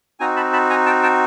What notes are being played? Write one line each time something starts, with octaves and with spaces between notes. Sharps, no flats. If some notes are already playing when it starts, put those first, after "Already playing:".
C4 D#4 F#4 G#5 A#5
A5 B5
A5 B5
G#5 A#5
G5 A5
G5 A5